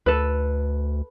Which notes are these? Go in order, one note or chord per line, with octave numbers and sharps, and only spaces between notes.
D2 A4 B4